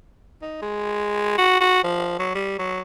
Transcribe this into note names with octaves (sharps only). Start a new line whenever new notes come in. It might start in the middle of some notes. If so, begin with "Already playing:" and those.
D#4
G#3
F#4
F#4
F3
F#3
G3
F#3